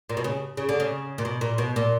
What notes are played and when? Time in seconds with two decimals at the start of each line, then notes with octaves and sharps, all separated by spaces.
0.09 A#2
0.17 B2
0.24 C#3
0.57 C#3
0.69 D3
0.80 C#3
1.18 A#2
1.25 B2
1.41 A#2
1.58 B2
1.76 A#2